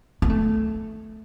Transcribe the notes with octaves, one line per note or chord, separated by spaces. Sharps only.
B3
A3